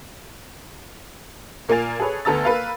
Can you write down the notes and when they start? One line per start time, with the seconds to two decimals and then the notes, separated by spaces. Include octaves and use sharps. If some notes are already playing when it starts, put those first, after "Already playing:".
1.69 A#2 A#3 F4 G#5 A6 F7
2.00 G#4 A4 B4 C#5
2.25 D2 B3 A4 A#5 E6 A6
2.45 A#3 B4 F5